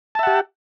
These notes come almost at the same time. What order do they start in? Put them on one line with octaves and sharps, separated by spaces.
A5 E5 F#5 G4